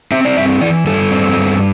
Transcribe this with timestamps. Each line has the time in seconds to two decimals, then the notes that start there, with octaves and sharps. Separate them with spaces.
0.11 C4 E5
0.25 D5
0.36 G2 E5
0.61 E3 D5
0.86 G2 A4
1.11 C4
1.36 G2